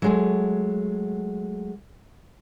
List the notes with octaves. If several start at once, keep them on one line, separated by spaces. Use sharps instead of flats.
F#3 G#3 A3